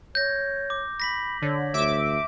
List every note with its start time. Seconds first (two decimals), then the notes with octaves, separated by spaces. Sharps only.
0.15 C#5 G6 A#6
0.70 D6
1.00 B5 A#6 B6 F#7
1.42 D3 C#5
1.74 D2 E5 D6